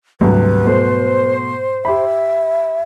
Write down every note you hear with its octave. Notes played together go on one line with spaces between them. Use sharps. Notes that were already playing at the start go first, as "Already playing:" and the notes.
D2 G#2 C3 F#3 G3 B4
B2 A3 C5
G4 E5 B5